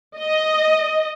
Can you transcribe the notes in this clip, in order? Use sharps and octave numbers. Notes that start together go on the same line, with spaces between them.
D#5